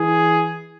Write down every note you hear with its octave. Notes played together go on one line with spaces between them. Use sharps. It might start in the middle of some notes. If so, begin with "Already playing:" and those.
Already playing: E3 G#4